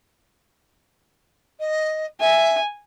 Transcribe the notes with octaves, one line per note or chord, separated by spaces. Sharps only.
D#5
E5 G#5